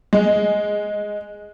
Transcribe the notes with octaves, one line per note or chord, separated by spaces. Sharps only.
G#3